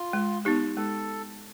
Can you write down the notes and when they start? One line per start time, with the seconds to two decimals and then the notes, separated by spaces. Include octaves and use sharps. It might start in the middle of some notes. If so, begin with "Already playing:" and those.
Already playing: F4
0.13 G#3
0.45 B3 D#4 G4
0.77 G#3 A4